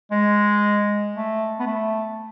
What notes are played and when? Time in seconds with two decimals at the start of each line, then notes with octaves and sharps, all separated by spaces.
0.11 G#3
1.16 A3
1.59 B3
1.67 A3